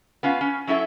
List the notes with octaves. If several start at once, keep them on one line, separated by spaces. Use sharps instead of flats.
B3 C#4 F4 F5
C#4
F#3 C#4 E4 A4 E5